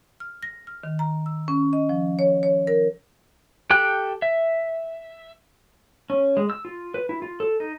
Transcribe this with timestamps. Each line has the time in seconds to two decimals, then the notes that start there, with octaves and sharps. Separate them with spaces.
0.20 F6
0.43 A#6
0.67 F6
0.83 D#3
0.99 A#5
1.26 E6
1.48 C#4
1.73 D#5
1.89 F3
2.19 C#5
2.43 C#5
2.67 A#4
3.70 G4 A4 G5 F#6
4.22 E5
6.10 C#4
6.37 G#3
6.50 E6
6.65 F4
6.94 B4
7.09 E4
7.22 F4
7.40 A4
7.60 D#4